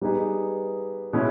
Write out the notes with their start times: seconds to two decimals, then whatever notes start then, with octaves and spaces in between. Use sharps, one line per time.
0.01 G3 B3 D#4 G#4 B4
1.13 B2 G#3 C#4 E4